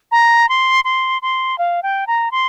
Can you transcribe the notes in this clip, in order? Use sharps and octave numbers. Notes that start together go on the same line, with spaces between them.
A#5
C6
C6
C6
F5
G5
A#5
C6